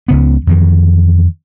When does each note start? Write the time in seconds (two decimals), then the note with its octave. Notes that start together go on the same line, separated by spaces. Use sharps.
0.08 C#2 C#3 B3
0.47 F2 D#3 E3